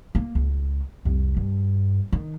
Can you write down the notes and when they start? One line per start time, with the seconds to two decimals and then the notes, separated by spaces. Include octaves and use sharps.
0.15 A#3
0.35 C#2
1.05 C2 F2
1.37 G2
2.12 D#3